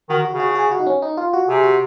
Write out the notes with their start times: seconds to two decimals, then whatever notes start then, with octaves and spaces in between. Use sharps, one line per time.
0.09 D#3 F#4
0.25 F#4
0.32 C#3
0.40 F#4
0.51 F#4
0.55 G#4
0.71 F#4
0.79 D#4
0.87 C#4
1.02 D#4
1.17 F4
1.33 F#4
1.48 C3 G#4
1.64 F#4